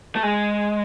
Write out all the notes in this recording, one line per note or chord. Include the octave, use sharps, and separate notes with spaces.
A3
G#3